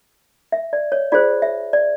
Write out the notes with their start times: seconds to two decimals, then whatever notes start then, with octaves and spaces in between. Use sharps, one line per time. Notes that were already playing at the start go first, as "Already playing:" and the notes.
0.52 E5
0.73 D5
0.92 C#5
1.12 F4 G#4 C5 D5
1.42 E5
1.73 D5